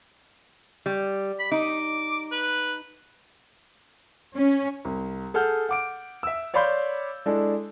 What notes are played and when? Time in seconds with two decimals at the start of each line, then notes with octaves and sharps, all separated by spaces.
0.86 G3
1.39 B5
1.52 D#4 D6
2.32 B4
4.36 C#4
4.85 C2
5.34 G#4 A4 F#5 F6 G6
5.69 F#5 D6 D7
6.23 E5 E6
6.54 C#5 D5 F5 B5 C6 G6
7.26 G#3 D4 E4 A4